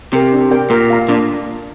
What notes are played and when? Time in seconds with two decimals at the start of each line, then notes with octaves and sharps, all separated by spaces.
0.12 C3 G4 A#4
0.33 D4
0.51 G4 A#4 D5 G5
0.70 A#2 A#4
0.90 F5 A#5
1.09 A#2 D4